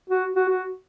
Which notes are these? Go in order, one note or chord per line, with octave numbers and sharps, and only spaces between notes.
F#4
F#4
F#4